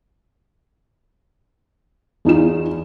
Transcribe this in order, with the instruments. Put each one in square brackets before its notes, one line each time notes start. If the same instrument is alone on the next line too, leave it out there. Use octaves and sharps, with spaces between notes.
[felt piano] E2 D#4 F4 E7